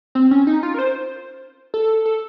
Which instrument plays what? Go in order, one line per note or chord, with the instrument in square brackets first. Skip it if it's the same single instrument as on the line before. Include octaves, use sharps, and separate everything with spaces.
[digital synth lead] C4
C#4
D#4
F4
A#4
C5
A4
A4